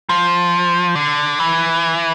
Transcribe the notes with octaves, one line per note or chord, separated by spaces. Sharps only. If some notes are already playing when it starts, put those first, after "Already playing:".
F3
D3
E3